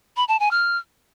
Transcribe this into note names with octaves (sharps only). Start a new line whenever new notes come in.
B5
A5
G#5
F6